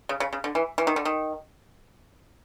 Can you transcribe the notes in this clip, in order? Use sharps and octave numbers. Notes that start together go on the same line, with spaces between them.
C#3
C#3
C#3
D3
E3
E3
D#3
D3
D#3